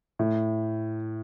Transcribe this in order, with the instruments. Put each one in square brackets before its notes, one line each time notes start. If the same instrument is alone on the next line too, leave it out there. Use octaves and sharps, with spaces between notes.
[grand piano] A2